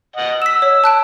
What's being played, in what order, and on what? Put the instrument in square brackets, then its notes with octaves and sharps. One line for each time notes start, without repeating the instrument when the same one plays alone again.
[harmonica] D#5 F#5
[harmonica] E6 [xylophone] B6 E7
[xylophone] C#5
A5 F#6 D7